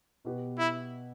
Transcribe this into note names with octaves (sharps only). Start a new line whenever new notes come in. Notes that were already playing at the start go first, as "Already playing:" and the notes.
B2 B3 G4
E4